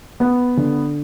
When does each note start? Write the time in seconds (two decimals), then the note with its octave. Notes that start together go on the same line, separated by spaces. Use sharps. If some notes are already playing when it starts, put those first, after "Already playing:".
0.20 B3
0.57 D3